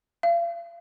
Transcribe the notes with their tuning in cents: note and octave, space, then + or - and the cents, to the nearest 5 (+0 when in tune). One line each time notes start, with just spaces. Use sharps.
F5 -40